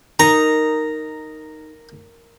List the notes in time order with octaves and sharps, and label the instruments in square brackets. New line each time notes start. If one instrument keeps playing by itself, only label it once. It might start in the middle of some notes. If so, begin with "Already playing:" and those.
[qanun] D#4 [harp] A#4 [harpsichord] A#5